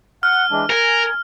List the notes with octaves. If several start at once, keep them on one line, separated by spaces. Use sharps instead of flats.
F#5 F6
E3 G#3 D4
A#4 G#5